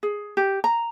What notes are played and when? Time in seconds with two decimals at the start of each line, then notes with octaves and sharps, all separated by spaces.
0.03 G#4
0.37 G4
0.64 A#5